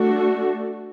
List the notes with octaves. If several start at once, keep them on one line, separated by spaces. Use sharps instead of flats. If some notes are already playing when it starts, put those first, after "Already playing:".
Already playing: A3 D4 F#4